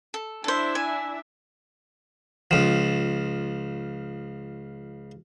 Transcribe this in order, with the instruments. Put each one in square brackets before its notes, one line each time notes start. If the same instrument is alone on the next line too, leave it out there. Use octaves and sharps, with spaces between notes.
[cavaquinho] A4
[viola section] D4 E4 E5 [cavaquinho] A4 C5
[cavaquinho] G#5
[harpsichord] C#2 F3